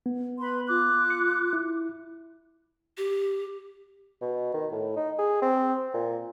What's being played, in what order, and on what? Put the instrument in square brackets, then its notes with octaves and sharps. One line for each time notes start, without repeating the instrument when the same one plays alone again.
[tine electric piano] B3
[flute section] B4 B5 C6
F4 D6 F#6
[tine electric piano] C#7
E4
[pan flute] G4
[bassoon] B2
D#3
A2
D#4
G#4
C4
A#2